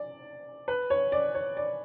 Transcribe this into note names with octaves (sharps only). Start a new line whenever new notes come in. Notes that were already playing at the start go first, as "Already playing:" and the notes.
Already playing: D5
B4
C#5
D5
C#5
D5